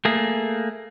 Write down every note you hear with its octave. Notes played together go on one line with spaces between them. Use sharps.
A3 A#3 G#4